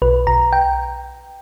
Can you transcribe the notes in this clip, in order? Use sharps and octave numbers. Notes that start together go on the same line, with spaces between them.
B1 B4
B1 A#5
G5